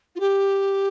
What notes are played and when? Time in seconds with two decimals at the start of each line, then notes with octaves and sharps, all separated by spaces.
0.15 F4
0.20 G4